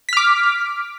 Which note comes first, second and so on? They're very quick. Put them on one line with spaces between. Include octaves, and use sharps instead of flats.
B6 F6 D6